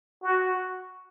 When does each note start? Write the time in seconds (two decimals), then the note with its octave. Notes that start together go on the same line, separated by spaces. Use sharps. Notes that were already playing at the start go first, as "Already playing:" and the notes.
0.23 F#4